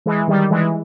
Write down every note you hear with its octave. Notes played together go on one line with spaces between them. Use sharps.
E3 G#3
D#3 G3
E3 G#3